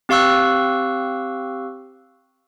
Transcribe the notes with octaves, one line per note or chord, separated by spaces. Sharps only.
C4 G4 F5 C#6 E6 F#6